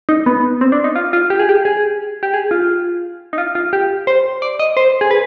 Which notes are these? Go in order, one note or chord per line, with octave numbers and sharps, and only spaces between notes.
D#4
B3
C4
D4
D#4
F4
F4
G4
G#4
G4
G#4
G4
G#4
F4
D#4
F4
F4
G4
C5
D5
D#5
C5
G#4
B4